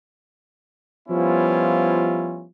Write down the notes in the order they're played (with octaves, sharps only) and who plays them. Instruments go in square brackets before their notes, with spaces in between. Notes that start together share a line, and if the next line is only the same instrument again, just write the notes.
[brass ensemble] F3 G3 B3 C#4 E4 F4